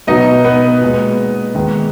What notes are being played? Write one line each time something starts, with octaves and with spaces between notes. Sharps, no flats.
B2 F#3 B3 D#4 D#5
B3 B4
A#2 G#3 B3
D#3 G#3 B3